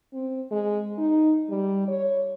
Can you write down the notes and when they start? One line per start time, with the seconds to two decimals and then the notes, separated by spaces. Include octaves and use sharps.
0.14 C4
0.51 G#3
0.98 D#4
1.50 G3
1.88 C#5